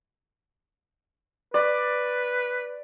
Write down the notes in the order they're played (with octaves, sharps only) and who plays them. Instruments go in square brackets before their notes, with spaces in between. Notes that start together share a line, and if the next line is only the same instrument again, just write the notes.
[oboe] B4 [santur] D5